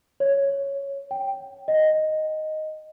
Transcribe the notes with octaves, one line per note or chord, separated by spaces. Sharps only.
C#5
G5
D#5